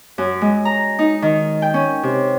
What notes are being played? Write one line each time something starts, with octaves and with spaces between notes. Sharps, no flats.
F#2
G#3
A#5
D#4
D#3
G5
C#4
C3